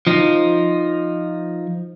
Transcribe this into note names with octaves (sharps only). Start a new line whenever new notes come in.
F3 D#4